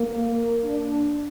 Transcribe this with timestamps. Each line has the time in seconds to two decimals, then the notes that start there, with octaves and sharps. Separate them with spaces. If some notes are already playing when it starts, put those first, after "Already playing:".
Already playing: A#3
0.64 D4